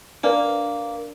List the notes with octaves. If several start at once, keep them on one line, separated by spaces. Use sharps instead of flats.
A#3 D4 B4 D5